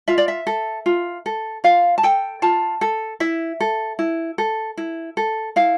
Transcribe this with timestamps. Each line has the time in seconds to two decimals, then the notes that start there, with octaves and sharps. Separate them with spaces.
0.08 F4 E5
0.18 D5
0.28 E5
0.47 A4
0.86 F4
1.26 A4
1.64 F4 F5
1.98 A5
2.03 A4 G5
2.42 F4 A5
2.81 A4
3.20 E4 E5
3.60 A4
3.99 E4
4.38 A4
4.77 E4
5.17 A4
5.56 E4 F5